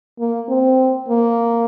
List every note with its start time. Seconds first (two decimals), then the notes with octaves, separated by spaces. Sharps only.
0.19 A#3
0.48 C4
1.08 A#3